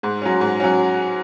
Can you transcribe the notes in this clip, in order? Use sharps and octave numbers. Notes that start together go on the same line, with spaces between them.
G#2
F#3 C#4
G#2
F#3 C#4